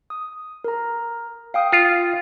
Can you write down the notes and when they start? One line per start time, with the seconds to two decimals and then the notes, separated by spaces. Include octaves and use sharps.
0.10 D#6
0.64 A#4 A#5
1.54 F5 G5 D#6
1.72 F4 D#6 C7